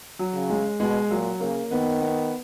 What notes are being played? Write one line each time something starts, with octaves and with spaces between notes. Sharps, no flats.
F#3
C#3
G#3
B2 G#3
A#2 F#3
C#3 A#3
D#3 B3
B3